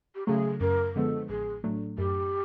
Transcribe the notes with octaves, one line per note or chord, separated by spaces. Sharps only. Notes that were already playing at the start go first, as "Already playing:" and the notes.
G4
C#3 F#3 A3 G#4
F#2 A#4
D3 F3 G#3 B3 A4
A1 G#4
A2 F#3 A3 D4
F#2 G4